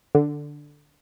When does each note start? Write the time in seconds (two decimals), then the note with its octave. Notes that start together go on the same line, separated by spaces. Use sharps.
0.15 D3